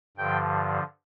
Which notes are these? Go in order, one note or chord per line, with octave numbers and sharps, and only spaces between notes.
G2 D3 F3 G5